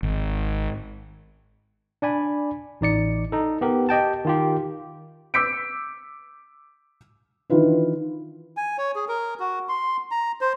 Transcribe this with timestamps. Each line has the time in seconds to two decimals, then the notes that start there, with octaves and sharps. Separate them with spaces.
0.03 G#1
2.02 D4 D5 G#5 B5
2.81 A1 D#4 D5 C#7
3.32 D#4 A4
3.61 B3 G4 A#4
3.89 G4 D#5 G5 A5
4.25 D#3 F4 G4
5.34 D6 E6 G6 B6 C#7 D7
7.50 D#3 E3 D4 F4 B4
8.57 G#5
8.78 C#5
8.95 G#4
9.08 A#4
9.40 F#4
9.69 C6
10.11 A#5
10.41 C5